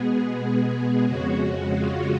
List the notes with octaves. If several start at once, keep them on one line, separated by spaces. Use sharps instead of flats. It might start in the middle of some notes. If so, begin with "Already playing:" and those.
Already playing: B2 G#3 B3 G#4
F2 C#3 G#3 C#4 F#4
F4